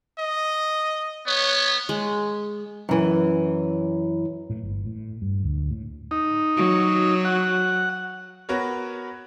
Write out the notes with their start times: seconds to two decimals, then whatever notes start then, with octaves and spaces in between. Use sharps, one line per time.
0.19 D#5
1.27 B3 C#5
1.89 G#3
2.89 F#2 E3
4.50 A2
4.63 G1
4.86 A2
5.22 G2
5.44 D2
5.71 A2
6.11 D#4
6.57 F#3
7.25 F#5
8.49 B3 F#4 A#4 B4 C#5